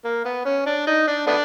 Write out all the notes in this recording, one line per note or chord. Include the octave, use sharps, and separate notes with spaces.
A#3
B3
C#4
D4
D#4
D4
A3 B3 D4